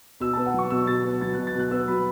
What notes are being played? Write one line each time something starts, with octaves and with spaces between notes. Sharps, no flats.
B2 E6
B3 A5
F#5
F#3 C#6
B2 E6
B2 A6
B3
F#3 A6
B2 F#6
A6
B2 F#6
B3 E6
F#3 B5